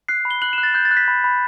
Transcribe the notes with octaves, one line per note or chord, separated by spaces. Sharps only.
F#6 C7
B5
G7
F#6 F#7
E7
F#6
A6
F#6 G6
A6
F#6
B6
B5
B5